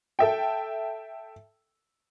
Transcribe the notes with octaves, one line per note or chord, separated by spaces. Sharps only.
A4 E5 G5